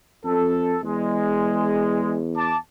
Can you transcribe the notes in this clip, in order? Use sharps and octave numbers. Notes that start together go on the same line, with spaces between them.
F2 A4
E2 G#3
A5 D6